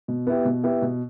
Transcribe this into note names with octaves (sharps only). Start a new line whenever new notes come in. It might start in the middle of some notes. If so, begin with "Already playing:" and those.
B2
B3 E4 G4
B2
B3 E4 G4
B2